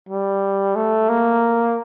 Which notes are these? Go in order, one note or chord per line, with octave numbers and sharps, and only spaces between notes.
G3
A3
A#3